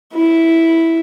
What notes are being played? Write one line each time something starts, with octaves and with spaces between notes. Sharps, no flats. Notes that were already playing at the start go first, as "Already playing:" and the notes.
E4